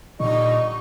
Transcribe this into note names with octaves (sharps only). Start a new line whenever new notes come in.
A#2 D3 G3 D#4 D#5 C#6